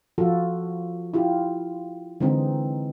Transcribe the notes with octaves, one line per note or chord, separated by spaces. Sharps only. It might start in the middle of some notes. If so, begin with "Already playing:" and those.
F3 F4 F#4 A4
E4 F4 G4
D3 E3 G#3 C4 D#4